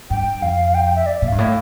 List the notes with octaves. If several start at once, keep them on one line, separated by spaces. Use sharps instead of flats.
G2 G5
F2 F5
G5
G5
E5
D5
E5
A#2
G2 F5
A2